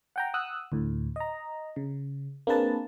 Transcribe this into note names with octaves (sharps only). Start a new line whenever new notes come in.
F#5 G5 A#5
F#5 D#6 E6 F#6
D2 A2
D#5 A#5
C#3
A#3 C4 D4 G#4 B4 A5